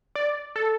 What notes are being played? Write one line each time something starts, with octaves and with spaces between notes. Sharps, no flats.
D5
A4